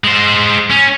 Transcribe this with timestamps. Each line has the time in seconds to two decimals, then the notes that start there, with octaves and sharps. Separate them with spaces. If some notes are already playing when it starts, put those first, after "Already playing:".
0.04 G#3 C5
0.70 C#4